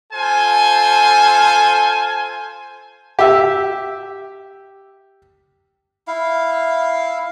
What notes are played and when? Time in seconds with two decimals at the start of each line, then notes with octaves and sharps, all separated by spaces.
0.13 F4 A4 C5 G#5
3.19 G4 E5
6.07 E4 F5